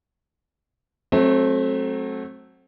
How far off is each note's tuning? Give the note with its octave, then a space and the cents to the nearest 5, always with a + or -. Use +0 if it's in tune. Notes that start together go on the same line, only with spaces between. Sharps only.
F#3 +10 A3 -15 C4 +25